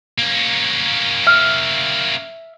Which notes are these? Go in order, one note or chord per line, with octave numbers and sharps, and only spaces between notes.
A#3 C#4
E5 F6